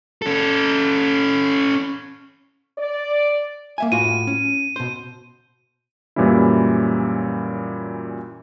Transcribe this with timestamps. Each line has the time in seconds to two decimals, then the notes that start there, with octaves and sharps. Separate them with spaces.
0.22 C#4 A4
2.78 D5
3.78 A#3 E5 G#5
3.92 A2 F4 F#4 D#7
4.27 C#4
4.76 B2 C5
6.16 F#2 A#2 E3 G3 C#4 E4